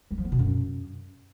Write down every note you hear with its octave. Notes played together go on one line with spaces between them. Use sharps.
G3
F3
B3
B2
F#2